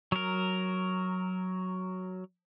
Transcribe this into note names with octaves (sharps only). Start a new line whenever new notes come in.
F#3 A#4